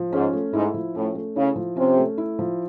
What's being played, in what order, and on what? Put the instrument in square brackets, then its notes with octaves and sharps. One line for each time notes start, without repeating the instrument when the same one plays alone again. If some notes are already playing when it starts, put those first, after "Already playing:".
Already playing: [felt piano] F3
[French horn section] G#2 [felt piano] C#4
[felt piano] A3
[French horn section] G#2 [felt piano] E4
[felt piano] F3
[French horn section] A2 [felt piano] C#4
[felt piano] A3
[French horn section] C#3 [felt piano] E4
[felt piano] F3
[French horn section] C3 [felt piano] C#4
[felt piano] A3
E4
F3